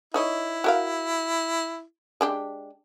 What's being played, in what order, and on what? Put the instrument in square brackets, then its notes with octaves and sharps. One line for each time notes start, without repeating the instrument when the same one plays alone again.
[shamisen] D#4 C#5 D#5 [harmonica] E4
[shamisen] F#4 A#4 F5
G#3 D4 G4